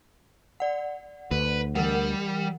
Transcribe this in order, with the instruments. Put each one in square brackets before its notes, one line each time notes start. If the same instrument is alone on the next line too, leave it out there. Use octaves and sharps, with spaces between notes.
[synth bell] D5 F#5
[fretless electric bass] D2 [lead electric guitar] B4
[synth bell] E3 A#4 F#5 [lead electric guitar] G3